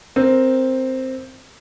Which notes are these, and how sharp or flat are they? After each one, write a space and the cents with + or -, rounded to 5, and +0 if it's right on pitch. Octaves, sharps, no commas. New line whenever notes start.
C4 +0 A#4 +0